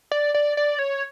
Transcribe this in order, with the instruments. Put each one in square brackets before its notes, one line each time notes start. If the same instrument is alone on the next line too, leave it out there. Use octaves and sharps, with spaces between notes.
[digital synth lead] D5
D5
D5
C#5